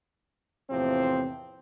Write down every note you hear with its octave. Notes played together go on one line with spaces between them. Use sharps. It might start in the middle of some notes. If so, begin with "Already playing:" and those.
E2 A2 C3 F3 C4